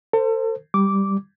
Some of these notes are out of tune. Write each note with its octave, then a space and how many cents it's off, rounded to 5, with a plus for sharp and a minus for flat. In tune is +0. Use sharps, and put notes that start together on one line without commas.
A4 +35 C5 +0
G3 +0 D6 -10